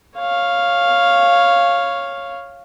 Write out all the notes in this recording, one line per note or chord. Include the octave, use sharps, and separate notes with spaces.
C#5 F5